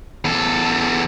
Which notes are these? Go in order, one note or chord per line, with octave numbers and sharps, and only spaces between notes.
E2 A4